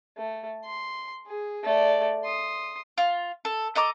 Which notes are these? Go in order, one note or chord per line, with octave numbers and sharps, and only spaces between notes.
A3
C6
G#4
A3 D5
C6 D#6
F4
A4
A4 D#5 A#5 D6